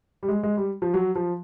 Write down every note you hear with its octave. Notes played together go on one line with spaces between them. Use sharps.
G3
G#3
G#3
G3
F3
F#3
F3